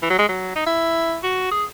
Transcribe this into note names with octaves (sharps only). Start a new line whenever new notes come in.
E3
F#3
G#3
F#3
D#4
E4
F#4
G#4